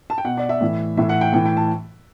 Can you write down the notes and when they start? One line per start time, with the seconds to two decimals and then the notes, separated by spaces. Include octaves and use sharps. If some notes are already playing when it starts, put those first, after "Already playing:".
0.10 A5
0.18 G5
0.25 B2 F#5
0.37 D5
0.49 E5
0.61 A2 E3
0.97 A2 E3 E5
1.09 F#5
1.21 G5
1.33 A2 E3 G5
1.45 G5
1.57 A5